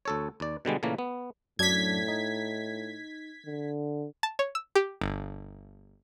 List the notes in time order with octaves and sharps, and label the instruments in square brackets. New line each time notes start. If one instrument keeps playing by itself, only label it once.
[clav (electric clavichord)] D2 A4 C#5
D#2 D5
B2 D3 G3 G#3
A#2 C#3 E3 A3 A#3
B3
[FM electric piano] F#2 F#3 D4 [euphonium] A2 [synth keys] G#6 B6
[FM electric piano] D#4
[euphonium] D3
[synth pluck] A5
C#5
E6
G4
G1